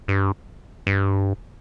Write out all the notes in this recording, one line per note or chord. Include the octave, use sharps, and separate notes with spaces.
G2
G2